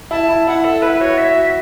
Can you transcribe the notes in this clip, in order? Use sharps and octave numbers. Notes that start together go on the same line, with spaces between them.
E4 A5
E4
E4 F#5
A4
E4 B4
F#4 C#5
E5
F#4